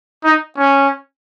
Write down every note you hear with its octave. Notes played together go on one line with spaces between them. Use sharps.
D#4
C#4